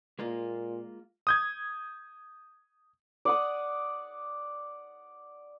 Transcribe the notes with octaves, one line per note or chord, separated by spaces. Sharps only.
A#2 G#3 A#3 F4
D#6 G6 G#6
D5 F#5 D#6